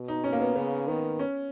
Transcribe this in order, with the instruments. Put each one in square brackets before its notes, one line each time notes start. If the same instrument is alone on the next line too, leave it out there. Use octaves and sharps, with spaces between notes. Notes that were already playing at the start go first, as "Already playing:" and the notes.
Already playing: [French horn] B2
[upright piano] D#4
C#4
A#3
B3
[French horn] C#3 [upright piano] B3
[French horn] D#3 [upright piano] B3
[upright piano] C#4